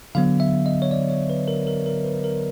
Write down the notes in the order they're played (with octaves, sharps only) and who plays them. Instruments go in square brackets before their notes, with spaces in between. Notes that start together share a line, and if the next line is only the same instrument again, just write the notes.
[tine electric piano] D3 F#3 B3 F5
E5
D#5
C#5
D5
C#5
B4
A#4
A#4
A#4
B4
A#4